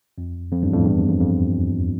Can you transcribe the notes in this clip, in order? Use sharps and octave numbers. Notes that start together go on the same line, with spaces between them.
F2
F2
E2 G2
F2 A2
E2 G2
F2
F2
F2